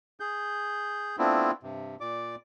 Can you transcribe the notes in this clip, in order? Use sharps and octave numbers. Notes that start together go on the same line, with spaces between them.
G#4 G6
A3 B3 C4 D4 E4 F4
G2 C3
A#2 D5 D6